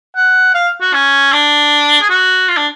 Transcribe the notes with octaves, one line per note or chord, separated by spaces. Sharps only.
F#5
F5
F#4
C#4
D4
G#4
F#4
F4
D4